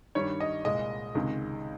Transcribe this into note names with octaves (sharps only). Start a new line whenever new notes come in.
G2 D#3 G3 C#5
D#5
C2 A#2 G#3 D#5
C#2 C3 D#3 G#3